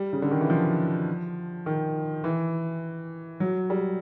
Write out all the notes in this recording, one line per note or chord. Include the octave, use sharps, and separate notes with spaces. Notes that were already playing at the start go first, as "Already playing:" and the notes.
Already playing: G3
C#3
D3
D#3
E3
F3
D#3
E3
F#3
G3